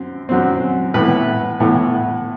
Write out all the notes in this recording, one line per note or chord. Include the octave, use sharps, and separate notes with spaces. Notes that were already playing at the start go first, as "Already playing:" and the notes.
Already playing: F#2 C4
F#2 F#3 C4
A2 E3 B3 B4
A2 E3 B3